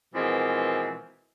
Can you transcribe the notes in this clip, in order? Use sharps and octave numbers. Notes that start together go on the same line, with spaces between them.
B2 E3 F3 G#3 A#3 C4